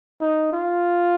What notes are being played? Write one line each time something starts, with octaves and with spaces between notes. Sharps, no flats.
D#4
F4